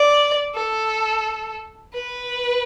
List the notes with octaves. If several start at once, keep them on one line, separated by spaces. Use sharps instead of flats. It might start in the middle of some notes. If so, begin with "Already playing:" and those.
Already playing: D5
A4
B4